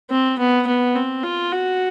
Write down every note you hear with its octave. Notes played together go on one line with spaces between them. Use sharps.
C4
B3
B3
C4
F4
F#4